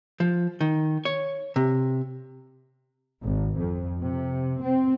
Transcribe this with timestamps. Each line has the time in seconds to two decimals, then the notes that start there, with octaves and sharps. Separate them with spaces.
0.20 F3
0.61 D#3
1.05 C#5
1.56 C3
3.23 G#1
3.58 F2
4.01 C3
4.63 C4